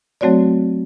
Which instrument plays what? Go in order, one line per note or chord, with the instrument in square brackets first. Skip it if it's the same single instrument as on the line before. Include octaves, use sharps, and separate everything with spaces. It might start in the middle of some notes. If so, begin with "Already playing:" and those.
[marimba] F#3 A3 C4 F#4 C#5 D5